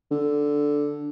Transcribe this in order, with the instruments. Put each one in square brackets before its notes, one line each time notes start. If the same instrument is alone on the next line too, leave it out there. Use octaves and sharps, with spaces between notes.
[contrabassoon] D3